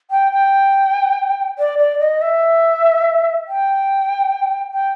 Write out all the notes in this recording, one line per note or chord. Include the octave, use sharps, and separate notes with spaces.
G5
G5
D5
D5
D#5
E5
G5
G5